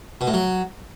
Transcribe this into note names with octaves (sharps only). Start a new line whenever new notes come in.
B2
A2
F#3